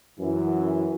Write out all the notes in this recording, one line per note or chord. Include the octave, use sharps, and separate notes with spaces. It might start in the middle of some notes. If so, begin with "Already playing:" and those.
F#2 E3